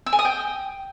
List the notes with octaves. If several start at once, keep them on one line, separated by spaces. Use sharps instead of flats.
E6
G#5
D#6
G5